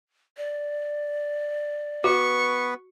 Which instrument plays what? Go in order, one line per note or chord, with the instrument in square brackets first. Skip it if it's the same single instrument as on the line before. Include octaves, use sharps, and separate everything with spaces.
[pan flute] D5
[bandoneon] B3 B4 [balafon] F#4 [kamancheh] C#6